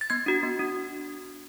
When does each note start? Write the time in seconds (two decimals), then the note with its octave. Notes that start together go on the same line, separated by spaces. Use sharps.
0.01 A6
0.10 B3 G#6
0.26 D4 F#4
0.43 B3
0.59 D4